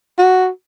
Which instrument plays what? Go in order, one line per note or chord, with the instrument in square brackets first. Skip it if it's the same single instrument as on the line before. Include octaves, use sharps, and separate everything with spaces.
[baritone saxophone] F#4